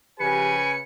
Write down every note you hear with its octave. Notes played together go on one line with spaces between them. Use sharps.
C#3 F3 G4 B4 G#5 C#7